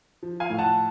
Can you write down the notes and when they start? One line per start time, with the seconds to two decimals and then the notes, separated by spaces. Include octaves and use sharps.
0.23 F3
0.40 F5 G#5
0.50 A2
0.58 F#5 A5